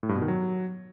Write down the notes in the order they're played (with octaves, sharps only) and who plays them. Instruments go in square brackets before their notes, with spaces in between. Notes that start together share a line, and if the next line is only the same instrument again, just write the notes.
[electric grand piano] A2
G2
B2
D#3
F#3